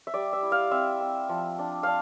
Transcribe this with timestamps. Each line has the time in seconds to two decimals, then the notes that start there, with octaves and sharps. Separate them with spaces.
0.07 E5
0.14 G3 D5
0.33 E5
0.43 E4
0.52 F5
0.71 C4 E5
1.00 C4
1.29 F3
1.59 D4
1.83 D4 F5